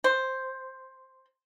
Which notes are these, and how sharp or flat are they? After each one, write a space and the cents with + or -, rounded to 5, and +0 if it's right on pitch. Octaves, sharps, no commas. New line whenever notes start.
C5 +5